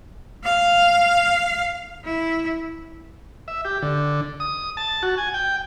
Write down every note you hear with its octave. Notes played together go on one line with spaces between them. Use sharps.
F5
E4
E5
G4
D3
D#6
A5
F#4
G#5
G5